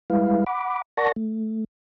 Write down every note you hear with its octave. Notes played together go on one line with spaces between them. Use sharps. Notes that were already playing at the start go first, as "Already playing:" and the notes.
G3 G#3 E4 B4 F5
F#5 B5 D6
A#4 D5 F#5 A5 C#6 A#6
A3